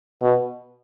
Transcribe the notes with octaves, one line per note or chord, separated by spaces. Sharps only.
B2